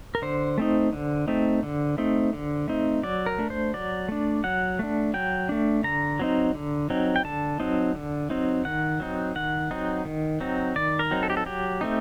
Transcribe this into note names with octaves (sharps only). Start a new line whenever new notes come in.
A#4
D3 C5
A3 C4 D#4
D3
A3 C4 D#4
D3
A3 C4 D#4
D3
A3 C4 D#4
F#3 D5
A#4
A3 D4
C5
F#3 D5
A3 D4
F#3 F#5
A3 D4
F#3 G5
A3 D4
D3 A#5
F#3 C4 D#4
D3
F#3 C4 D#4
G5
D3 A5
F#3 C4 D#4
D3
F#3 C4 D#4
D#3 F#5
F#3 C4 D#4
D#3 F#5
F#3 C4 D#4
D#3
F#3 C4 D#4
D#3 D5
A#4
F#3 C4 D#4
A4
G4
A4
F#3 G4
A3 C4 D#4